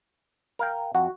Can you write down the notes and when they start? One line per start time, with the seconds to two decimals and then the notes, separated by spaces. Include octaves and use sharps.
0.59 A#4 F5 G5
0.95 F2 F#4